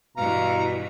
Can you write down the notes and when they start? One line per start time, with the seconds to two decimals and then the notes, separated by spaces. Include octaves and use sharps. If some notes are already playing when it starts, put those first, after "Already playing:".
0.17 G2 B2 E3 F5 A#5